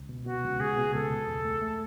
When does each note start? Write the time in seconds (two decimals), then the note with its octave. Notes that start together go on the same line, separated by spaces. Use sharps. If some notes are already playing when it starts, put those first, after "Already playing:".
Already playing: C#2
0.09 B2
0.26 B2 F#4
0.44 C#2
0.60 C#2 G#4
0.77 B2
0.94 C#2 A4
1.11 C#2
1.28 E2
1.45 A3
1.62 A3